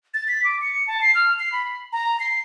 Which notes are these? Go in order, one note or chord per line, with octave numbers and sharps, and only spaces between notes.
A6
B6
D6
C#7
A5
C7
F6
C7
B5
A#5
C7